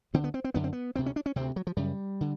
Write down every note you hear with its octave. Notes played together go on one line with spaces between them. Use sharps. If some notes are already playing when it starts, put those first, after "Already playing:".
D2 D3 C4
B3
C4
C4
F#2 D3 B3
C4
B3
D2 C3 C4
C#4
D4
C#4
D2 C3 C4
F#3
F3
F#2 C#3 G3
D3